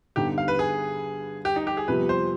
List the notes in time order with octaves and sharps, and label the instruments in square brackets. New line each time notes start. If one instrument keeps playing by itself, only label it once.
[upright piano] G2 D3 G3 B3 D#4 [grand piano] G4
[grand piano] F5
B4
G#4
G4
D#4
G4
G#4
[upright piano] F2 C3 G3 B3 [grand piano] B4
[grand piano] C5